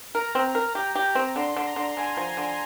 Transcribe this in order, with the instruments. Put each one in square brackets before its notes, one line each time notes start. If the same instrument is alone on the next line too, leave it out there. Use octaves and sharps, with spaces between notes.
[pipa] A#4 [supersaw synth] A#5
[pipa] C4
A#4
G4
G4
C4
[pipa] D3 [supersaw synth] C6
[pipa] D3
[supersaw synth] A#5
[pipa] D3
[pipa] D3 [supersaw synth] G#5
[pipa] F3
D3